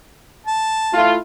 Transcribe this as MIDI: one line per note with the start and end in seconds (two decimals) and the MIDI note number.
0.47 1.15 81
0.93 1.16 57
0.93 1.16 64
0.93 1.16 65